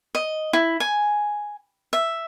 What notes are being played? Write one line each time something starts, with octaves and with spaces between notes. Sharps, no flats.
D#5
E4
G#5
E5